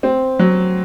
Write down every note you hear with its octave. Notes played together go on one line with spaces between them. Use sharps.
C4
F#3